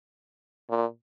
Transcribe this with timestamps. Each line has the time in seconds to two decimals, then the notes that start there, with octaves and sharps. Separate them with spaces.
0.70 A#2